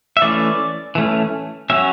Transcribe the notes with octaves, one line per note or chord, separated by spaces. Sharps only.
E5
E3 A3 C#4 D5
E3 A3 C#4
F#3 C#4 E5